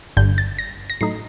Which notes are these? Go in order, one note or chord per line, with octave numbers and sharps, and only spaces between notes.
G1 G2 D3 G6
A6
A#6
A#6
A2 F#3 A3 D#4 C7